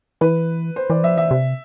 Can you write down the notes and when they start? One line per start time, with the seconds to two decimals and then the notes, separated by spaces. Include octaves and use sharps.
0.21 E3 B4
0.76 C5
0.90 E3 D5
1.03 F3 E5
1.17 E3 E5
1.31 C3